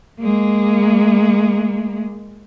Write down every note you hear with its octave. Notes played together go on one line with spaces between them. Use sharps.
G#3 A#3